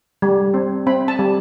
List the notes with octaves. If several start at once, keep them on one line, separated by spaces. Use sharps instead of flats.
G3
C4
C4 B5
A5
G3